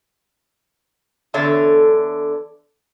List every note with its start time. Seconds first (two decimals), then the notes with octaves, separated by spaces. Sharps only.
1.34 E2 D3 D4 A4 C#5